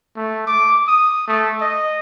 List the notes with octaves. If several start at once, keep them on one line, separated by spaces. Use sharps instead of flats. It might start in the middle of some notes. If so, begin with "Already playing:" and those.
A3
D6
D#6
A3
D#5